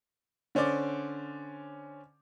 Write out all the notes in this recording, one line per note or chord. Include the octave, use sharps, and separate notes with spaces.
D3 C#4 C5 D5 D6